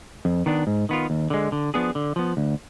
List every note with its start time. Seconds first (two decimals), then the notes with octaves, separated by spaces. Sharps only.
0.25 F2
0.46 D#3 B3 D4
0.67 G#2
0.89 D#3 B3 F4
1.10 D#2
1.30 D3 G#3
1.52 D3
1.74 F3 B3 D4 G#4
1.95 D3
2.16 F3 B3
2.37 D2